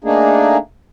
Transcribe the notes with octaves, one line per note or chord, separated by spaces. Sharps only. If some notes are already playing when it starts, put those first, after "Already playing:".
A3 A#3 D4 D#4 G#4